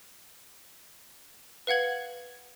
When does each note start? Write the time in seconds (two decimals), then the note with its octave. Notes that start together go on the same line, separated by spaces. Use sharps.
1.67 B4 F5 F#5 G#6 F#7